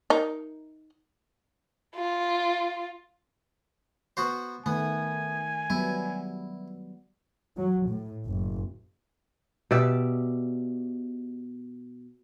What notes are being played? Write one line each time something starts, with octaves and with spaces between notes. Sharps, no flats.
D#4 A#4
F4
B3 F#4 C5
D#3 A3 B3 G#5
F#3 G3 B3 E4
F#3
A2
F#1
B2 G4 D5 E5